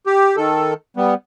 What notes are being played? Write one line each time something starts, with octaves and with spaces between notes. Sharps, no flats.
G4
D#3 A4
G3 B3